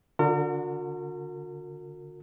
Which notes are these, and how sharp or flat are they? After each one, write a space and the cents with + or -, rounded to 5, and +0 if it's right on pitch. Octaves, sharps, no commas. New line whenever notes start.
D3 +0 F#4 -40 A#4 -40